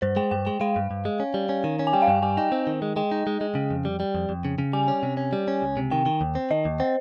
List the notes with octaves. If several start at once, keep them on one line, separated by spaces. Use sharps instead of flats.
G2 C5
G#3 G5
G2 G5
G#3 G5
G#3 F5
G2
G2
G#3
C#4
G3
C#4
D#3
C#4
G#5
G3 G5
F5
G2 G5
G3 G#5
D#4 G5
C4
D#3
G#3
G#3 G5
D#4
G#3
G#3
C#3
F2
G3
G3
F2
F2
C#3
C#3
G3 G#5
C#4
C3
C#4
G3
C#4
C#2
C3
D#3 G5
D#3
D#2
C4
D#3 D#5
D#2
C4 C5